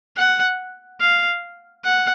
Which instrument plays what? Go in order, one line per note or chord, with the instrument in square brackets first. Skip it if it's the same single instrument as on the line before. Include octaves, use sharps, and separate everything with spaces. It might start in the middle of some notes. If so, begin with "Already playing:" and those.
[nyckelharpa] F#5
F5
F#5